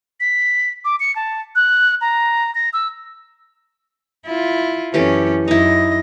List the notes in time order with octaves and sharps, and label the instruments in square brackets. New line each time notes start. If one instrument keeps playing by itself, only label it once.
[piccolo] B6
D6
C#7
A5
F#6
A#5
A#6
E6
[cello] E4 F4
[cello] F#2 C#4 [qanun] E3 G4 A4
[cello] F#2 D#5 [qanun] D#4 E4